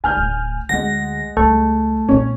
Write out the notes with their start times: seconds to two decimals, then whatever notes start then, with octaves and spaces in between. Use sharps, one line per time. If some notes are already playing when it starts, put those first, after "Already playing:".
0.04 D3 G#5 F6 G6
0.17 D1
0.69 D2 G#3 F#5 A#6
1.37 C#2 G3 A3
2.08 A#2 B3 C#4